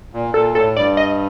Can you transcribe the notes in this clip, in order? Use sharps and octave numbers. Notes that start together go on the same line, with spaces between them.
A#2
A#2 A4
A2 A4
G2 D5
D#5